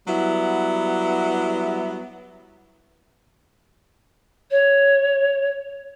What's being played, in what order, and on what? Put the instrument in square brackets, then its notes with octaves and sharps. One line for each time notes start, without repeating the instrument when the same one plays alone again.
[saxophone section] F#3 G3 B3 E4
[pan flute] C#5